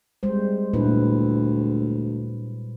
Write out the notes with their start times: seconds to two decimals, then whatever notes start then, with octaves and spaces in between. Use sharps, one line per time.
0.23 G3 G#3 C5
0.73 D2 A#2 E4 B4